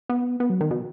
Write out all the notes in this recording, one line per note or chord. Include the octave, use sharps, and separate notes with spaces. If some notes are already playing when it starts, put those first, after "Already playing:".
B3
B3
F#3
D#3
B2